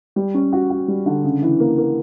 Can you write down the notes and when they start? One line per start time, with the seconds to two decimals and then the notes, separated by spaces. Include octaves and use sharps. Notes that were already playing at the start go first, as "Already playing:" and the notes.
0.16 G3
0.34 C#4
0.52 F#4
0.70 F#4
0.88 G3
1.06 D3
1.24 C#3
1.42 E3
1.60 A#3
1.78 A#3